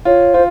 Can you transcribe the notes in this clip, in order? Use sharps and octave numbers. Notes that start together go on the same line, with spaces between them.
F4 C#5
F4 C5